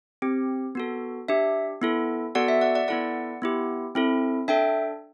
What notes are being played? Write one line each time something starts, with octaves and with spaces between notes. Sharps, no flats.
C4 G4
B3 F#4 A4
D4 G4 E5
B3 E4 A4
B3 F#4 A4 D5 F#5
E5
D5 F#5
D5 F#5
B3 E4 A4 D5 F#5
B3 E4 G4
C4 E4 A4
D4 A4 E5 G5